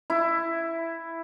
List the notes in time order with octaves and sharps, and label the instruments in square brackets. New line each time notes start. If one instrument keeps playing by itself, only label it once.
[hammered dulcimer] E4